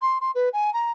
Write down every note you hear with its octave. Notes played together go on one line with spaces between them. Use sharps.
C6
C6
B4
G#5
A#5